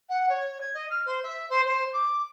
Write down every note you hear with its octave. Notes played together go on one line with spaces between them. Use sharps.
F#5
C#5
G#6
D#5
F6
C5
E5
C5
C5
D6